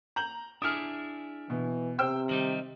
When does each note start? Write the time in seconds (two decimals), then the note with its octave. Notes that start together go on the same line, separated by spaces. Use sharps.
0.16 A#5 G6 F#7
0.62 D4 E4 G#4 D#6 F6
1.50 B2 E3
1.98 C3 C5 G5 E6
2.29 D#3 G3 D#4 F#7